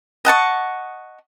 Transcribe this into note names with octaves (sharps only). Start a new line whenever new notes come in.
D#5 F#5 A5 C#6